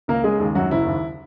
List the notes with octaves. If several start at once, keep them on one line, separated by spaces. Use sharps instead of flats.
C#2 A#3 A#4
C#3 G#3 G#4
D#2
F#2 F#3 F#4
F#1 E4
D#2